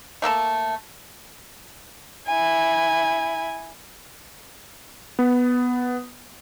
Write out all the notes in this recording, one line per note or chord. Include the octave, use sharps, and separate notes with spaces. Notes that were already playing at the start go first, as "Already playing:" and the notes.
A3 A#3 A4 A5
E4 G#5
B3